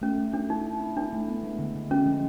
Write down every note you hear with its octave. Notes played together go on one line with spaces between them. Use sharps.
A3 C#4
A3
A3 D4
D#4 E4
E4
C4
D4 E4
A3
B3
G#3
D3
D3
G#3 C#4
F3